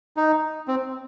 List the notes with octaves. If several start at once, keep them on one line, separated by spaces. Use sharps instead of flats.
D#4
C4